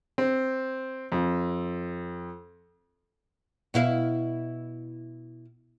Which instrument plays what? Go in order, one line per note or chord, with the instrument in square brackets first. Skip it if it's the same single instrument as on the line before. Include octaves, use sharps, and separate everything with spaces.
[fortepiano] C4
F2
[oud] B2 E4 F5